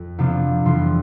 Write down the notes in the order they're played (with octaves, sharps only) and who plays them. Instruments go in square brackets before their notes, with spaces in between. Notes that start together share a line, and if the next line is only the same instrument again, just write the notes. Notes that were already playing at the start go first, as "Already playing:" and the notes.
Already playing: [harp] F2
C3 F3 B3 D4 F4
F2 C3 E3 G3 C6